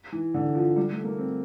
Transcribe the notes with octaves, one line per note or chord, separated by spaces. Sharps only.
E3
D3
F3
G3
A3
A#3
C4